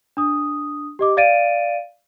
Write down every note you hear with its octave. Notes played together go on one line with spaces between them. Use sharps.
D4 D#6
G4 D#5 D6
D5 F5 A6 D7 D#7